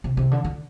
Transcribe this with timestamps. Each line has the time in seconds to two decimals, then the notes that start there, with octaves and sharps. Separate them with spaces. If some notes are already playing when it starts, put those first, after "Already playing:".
0.04 C3
0.17 C3
0.31 D3
0.44 D3